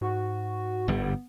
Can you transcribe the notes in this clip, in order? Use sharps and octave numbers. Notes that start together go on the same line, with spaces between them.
G#2 F#4
G1 D3 G3 B3